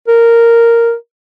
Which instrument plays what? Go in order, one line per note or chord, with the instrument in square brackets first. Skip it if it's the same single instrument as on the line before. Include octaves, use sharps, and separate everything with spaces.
[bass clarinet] A#4